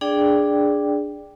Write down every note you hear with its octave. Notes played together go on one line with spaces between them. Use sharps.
D4 G#4 D5 G5